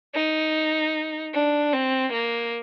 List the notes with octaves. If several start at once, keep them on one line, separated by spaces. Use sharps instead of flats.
D#4
D4
C4
A#3